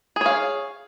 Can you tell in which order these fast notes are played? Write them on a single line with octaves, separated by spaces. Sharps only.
G#4 C#5 F5